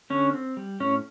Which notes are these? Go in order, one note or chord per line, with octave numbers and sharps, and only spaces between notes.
D3 C#4
C4
G3
A2 C#4